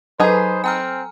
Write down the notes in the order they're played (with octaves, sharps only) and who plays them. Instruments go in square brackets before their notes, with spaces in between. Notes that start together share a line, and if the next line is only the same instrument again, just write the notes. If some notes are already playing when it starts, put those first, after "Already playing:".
[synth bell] F#3 A4 [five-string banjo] D#4 G#4 B4 [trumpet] C5
[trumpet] C4 [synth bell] G#5 A#5 F6